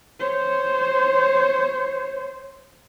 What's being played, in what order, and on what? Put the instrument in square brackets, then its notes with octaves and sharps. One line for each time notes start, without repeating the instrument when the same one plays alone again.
[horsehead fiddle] C5 C#5